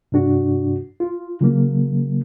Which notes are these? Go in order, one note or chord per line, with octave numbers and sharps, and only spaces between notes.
G2 C3 D4 F#4
F4
C#3 F#3 A#3